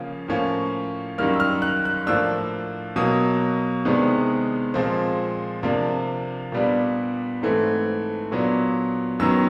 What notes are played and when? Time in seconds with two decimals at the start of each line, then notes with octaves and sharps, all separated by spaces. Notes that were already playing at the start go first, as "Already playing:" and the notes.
Already playing: C#3 F3 A#3 C#4
0.28 A2 F3 A#3 C#4
1.18 F#2 D#3 G3 A#3 F6
1.34 E6
1.40 F6
1.62 F#6
1.85 F#6
2.07 A2 F3 A#3 D4 E6
2.96 B2 F#3 A#3 D#6
3.85 C3 D#3 G#3 B3 D4
4.74 A#2 F3 G#3 C4
5.63 C3 F3 A#3 D4
6.52 A#2 G3 B3 D4
7.42 G#2 E3 A3 C4
8.31 A#2 F#3 B3 D4
9.20 F#2 D#3 F#3 B3 E6